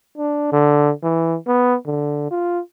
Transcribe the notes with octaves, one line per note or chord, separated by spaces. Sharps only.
D4
D3
E3
B3
D3
F4